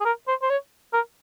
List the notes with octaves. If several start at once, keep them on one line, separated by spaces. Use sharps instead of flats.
G#4
A#4
C5
C5
C#5
A#4